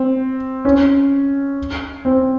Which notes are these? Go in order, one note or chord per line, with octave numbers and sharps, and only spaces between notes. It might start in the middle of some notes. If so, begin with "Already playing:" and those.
Already playing: C4
C#4
C4